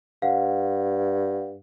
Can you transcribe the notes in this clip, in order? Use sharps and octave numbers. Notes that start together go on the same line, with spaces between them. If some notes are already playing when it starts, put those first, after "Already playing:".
G2 F5 F#5